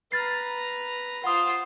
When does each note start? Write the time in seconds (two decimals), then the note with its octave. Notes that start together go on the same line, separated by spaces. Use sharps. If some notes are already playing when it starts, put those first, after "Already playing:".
0.12 B4 A#5 F6 A6 C7
1.24 F4 C5 F#5 D#6